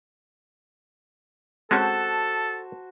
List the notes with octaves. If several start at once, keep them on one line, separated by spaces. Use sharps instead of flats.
G#3 C4 C#4 F#4 A4 C5 A5